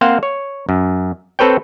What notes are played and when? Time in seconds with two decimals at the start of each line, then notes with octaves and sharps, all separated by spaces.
0.01 A#3 C4 C5 F5 F#5
0.23 C#5
0.69 F#2
1.39 C4 A4 B4 C#5 G5